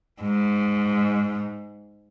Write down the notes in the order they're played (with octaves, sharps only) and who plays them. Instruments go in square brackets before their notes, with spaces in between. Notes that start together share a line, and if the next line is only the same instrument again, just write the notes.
[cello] G#2